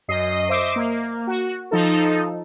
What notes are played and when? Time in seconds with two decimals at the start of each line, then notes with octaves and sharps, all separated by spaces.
0.08 F#2 D#5 C7
0.49 C5 D#5 E5 D6
0.76 A#3
1.27 F#4
1.71 F3 D#4 A4